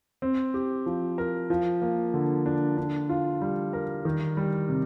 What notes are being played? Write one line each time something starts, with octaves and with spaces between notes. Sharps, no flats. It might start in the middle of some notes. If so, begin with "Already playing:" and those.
C4
G4
F3
A#4
F3
A#3
D3
D4
D4
F4
G3
A#4
D#3
G3
C3